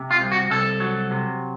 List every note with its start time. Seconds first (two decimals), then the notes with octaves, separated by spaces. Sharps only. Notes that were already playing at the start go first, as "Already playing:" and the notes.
Already playing: C3
0.11 F4
0.20 C2
0.32 F#4
0.51 C2 A4
0.80 F#3
1.11 C3